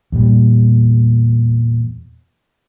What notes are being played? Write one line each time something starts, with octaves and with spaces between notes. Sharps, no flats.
E2 A#2 G3